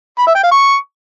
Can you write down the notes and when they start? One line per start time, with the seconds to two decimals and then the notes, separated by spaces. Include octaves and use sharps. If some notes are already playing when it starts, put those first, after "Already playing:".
0.19 B5
0.27 E5
0.35 G5
0.43 F5
0.52 C#6